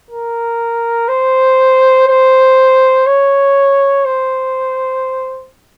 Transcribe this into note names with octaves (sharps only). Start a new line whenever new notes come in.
A#4
C5
C5
C#5
C5